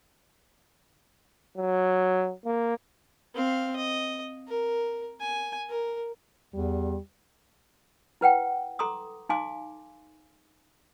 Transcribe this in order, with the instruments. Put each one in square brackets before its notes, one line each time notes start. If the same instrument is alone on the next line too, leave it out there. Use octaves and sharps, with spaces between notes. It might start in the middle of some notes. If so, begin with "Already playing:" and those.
[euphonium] F#3
A#3
[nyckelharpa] C4 F5
D#5
A#4
G#5
A#4
[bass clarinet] E2 [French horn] G3
[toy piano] E4 B4 F#5 G5
A4 A#5 C6 D6 D#6
D#4 F5 G#5 C6 D6